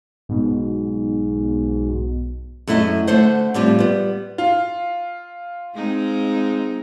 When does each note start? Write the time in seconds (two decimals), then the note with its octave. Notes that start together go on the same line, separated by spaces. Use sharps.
0.29 B1 G#2 B2
2.67 F#2 A3 E4 G#4 D#5
3.07 D3 A3 C5 F#5
3.54 A2 F3 G3 C4 F4
3.79 G3 B3
4.38 F4
5.75 G#3 C4 D#4